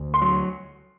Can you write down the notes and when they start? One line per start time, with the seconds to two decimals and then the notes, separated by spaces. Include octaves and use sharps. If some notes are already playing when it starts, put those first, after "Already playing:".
Already playing: D2
0.14 C6
0.22 F#3